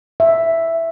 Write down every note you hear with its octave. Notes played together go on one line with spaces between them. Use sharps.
E5